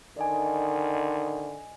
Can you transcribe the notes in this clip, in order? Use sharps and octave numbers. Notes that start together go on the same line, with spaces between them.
D3 D#3 D5 D#5 G#5